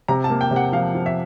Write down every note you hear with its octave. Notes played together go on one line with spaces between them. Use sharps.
C3 A#5
A5
A#3
G5
C3
F#5
F3 F5
F3
E5